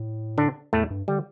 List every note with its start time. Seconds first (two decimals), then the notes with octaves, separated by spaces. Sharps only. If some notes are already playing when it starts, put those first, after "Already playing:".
Already playing: A2
0.38 D3 D4
0.73 E2 A2 A3
0.90 G2
1.08 D3 G3